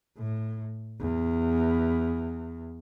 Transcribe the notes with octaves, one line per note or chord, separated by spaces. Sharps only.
A2
E2